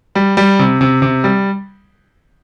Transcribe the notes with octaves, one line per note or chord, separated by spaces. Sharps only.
G3
G3
C3
C3
C3
G3